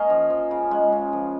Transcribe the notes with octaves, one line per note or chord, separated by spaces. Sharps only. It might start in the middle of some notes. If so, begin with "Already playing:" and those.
Already playing: A#3 C#4 D#5 F5 G#5 A#5
F3
F3
C#3
G#3
C#3
F3